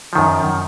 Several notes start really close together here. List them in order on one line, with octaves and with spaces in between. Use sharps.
F3 D#3 F#2